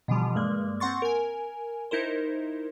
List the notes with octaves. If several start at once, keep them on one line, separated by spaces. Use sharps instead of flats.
B2 D3 E3 F3 G3
G2 G#3 A#3
C4 F#5 C6 C#6 A6
A#4 G#5
D#4 E4 A#4 C5